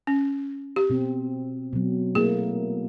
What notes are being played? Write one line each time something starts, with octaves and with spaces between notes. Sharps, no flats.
C#4
G4
B2 C4
B2 F#3
A3 A#3 E4 G#4